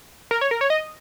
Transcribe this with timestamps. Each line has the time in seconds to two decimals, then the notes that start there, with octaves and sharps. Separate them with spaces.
0.31 A#4
0.41 C#5
0.51 A#4
0.61 C#5
0.70 D#5